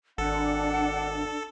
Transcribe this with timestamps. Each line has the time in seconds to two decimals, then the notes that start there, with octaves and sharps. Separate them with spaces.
0.18 G#1 D4 A4 F#5